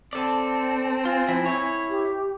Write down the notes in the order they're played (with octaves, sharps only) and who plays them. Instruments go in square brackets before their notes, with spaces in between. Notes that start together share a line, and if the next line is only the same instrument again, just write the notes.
[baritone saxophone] C4 [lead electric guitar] A4 D5 [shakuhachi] A5
[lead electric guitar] F4 [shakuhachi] G#5
[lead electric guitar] F3 E4
E4 C#5
[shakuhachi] G4